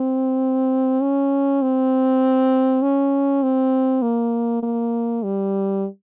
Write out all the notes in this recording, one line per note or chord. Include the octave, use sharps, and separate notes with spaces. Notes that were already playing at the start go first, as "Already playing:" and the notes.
Already playing: C4
C#4
C4
C#4
C4
A#3
A#3
G3